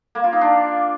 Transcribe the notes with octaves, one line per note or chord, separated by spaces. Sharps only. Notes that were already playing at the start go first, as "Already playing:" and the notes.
A#3
F4
D#4
D4